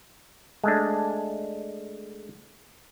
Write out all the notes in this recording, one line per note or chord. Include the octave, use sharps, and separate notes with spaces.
G#3 A3 D4